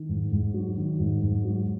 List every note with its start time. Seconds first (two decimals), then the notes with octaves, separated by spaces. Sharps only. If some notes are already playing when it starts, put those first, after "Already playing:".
Already playing: D#3
0.09 G#2
0.32 G#2
0.54 F#3
0.77 D#3
1.00 G#2
1.23 G#2
1.45 F#3